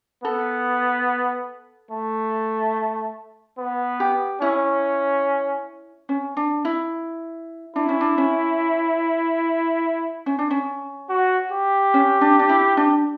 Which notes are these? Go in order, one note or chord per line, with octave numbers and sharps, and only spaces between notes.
B3 A4
A3
B3
G4
C#4 E4
C#4
D4
E4
D4 E4
C#4
D4
C#4
C#4
D4
C#4
F#4
G4
C#4
D4
D4
E4
D4